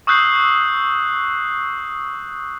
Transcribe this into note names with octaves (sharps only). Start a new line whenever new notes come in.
C#6 D#6 E6 F#6 G6 C7